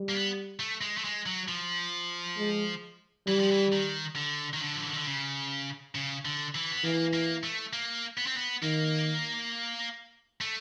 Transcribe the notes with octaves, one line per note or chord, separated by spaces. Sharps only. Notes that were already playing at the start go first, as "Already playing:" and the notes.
Already playing: G3
A#3
B3
A3
G#3
A3
G#3
F#3
F3
G#3
E3 G3
F3
E3
D#3
D3
D#3
D3
F3
E3
D#3
D3
C#3
C#3
D3
E3
B3
E3 A#3
A#3
A3
A#3
B3
C4
B3
D#3 A#3
A3